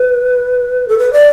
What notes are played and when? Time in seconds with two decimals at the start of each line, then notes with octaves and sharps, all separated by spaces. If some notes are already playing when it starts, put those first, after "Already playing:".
Already playing: B4
0.88 A4
0.98 B4
1.13 D5